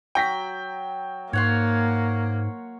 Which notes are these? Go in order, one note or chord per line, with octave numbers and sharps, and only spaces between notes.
F#3 G5 A#6 B6
G#2 A#3 C#5 F#5 C6